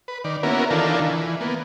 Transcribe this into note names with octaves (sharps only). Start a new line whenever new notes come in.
B4
D#3 D5
A#3 B3 C#4 E4 F#4 A#4
D#3 E3 D4 F4 A4 A#4
E3
A#3 B3